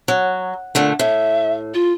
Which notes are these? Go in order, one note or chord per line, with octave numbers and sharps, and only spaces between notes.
F#3
A#2 D3 A3
A2 E5
F4